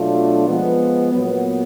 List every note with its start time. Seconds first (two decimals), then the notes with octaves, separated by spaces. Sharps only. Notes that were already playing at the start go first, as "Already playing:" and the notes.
Already playing: B2 F#3 A3 D4 F4
0.46 F3 G#3 B3
1.13 A#2 F#3 B3